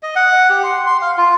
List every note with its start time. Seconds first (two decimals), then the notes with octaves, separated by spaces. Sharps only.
0.03 D#5
0.16 F#5
0.50 G4
0.63 C6
0.86 C6
1.02 F5
1.18 F4